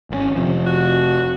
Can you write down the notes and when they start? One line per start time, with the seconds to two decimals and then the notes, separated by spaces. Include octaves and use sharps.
0.10 G#1 D3 C#4
0.35 F1 C3 F3
0.67 F#4